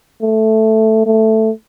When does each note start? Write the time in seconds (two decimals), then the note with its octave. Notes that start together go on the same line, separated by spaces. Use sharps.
0.22 A3
1.06 A3